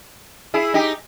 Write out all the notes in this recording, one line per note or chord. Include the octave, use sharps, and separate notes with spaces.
E4 G#4
D#4 G4